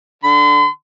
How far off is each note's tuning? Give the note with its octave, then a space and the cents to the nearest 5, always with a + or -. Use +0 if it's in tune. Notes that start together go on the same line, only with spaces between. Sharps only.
D3 +0 C6 -45